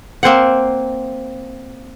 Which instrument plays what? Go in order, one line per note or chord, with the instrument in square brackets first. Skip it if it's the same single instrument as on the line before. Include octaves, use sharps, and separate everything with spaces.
[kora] A#3 C4 C5 F#5